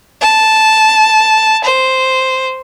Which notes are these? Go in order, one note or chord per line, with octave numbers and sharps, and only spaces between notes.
A5
C5